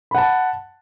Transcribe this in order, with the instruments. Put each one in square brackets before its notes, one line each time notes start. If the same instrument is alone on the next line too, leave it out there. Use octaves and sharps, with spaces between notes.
[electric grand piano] B5
F#5
A5